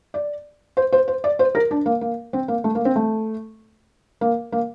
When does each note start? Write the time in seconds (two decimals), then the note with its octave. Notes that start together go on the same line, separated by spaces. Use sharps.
0.14 D5
0.77 C5
0.92 C5
1.08 C5
1.24 D5
1.39 C5
1.55 A#4
1.71 D4
1.86 A#3
2.01 A#3
2.33 C4
2.48 A#3
2.64 A3
2.75 A#3
2.85 C4
2.96 A3
4.21 A#3
4.52 A#3